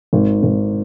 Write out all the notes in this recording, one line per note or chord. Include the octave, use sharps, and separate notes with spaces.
G#1
G#1